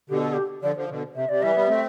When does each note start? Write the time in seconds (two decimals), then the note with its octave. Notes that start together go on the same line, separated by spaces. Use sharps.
0.10 B2 D3 G4
0.21 A4
0.33 G4
0.63 D3 F3 D5
0.76 D3 F3
0.89 B2 D3
1.15 C3 E5
1.29 C3 D5
1.42 E3 G3 E5
1.55 G3 B3
1.69 A3 C4